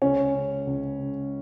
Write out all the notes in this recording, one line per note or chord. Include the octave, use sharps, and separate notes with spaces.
C#2 C#4
C#3
C#2
C#3